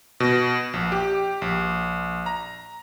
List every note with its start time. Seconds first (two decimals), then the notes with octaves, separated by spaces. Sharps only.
0.20 B2
0.73 A#1
0.92 G4
1.42 A#1
2.26 A#5